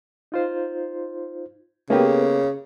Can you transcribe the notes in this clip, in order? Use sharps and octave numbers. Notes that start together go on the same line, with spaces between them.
D#4 F4 C5
C#3 A#3 B3 G4 A4 B4